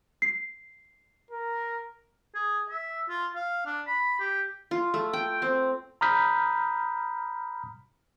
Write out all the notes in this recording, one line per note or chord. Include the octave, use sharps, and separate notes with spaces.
C7
A#4
G#4
E5
F4
F5
D4
B5
G4
F4
A3
G5
C4
A#5 B5 D#6 F6 G6 B6